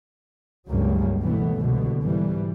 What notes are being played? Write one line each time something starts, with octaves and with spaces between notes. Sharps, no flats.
C#2 G2 F#3 G3 A#3
C#2 B2 E3 A3 B3
C2 B2 D3
G#2 E3 G3